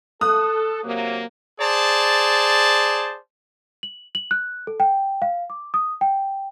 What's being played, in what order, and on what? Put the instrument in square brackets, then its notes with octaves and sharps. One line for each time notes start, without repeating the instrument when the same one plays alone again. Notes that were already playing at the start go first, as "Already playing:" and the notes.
[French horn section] A4 [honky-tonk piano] D#6 F#6
[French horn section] C3 F#3 A#3
[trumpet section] G#4 C5 D5 A5
[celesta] F#7
F#7
F#6
A4
G5
F5
D6
D#6
G5